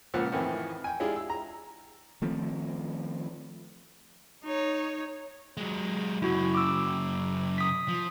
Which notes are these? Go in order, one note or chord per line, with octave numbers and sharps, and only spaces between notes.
C#2 A#2 F3 F#5
F2 A2 D#3 E3
G5 G#5
G#3 D4 E4 F4 G4 G#4
E6
A#5
D#3 F3 A3 C4
D#4 C#5
F#3 G#3
F#2 C#3 E4 F#4
D6 E6
D#6 B6
F3